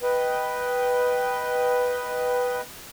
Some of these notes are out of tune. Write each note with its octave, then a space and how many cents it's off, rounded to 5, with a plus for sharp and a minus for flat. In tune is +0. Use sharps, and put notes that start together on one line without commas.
B4 +0 D#5 +0 G5 -10